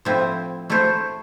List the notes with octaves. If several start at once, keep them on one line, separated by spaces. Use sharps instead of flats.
A2 F3 C4 E4
A3 E4 A4 C5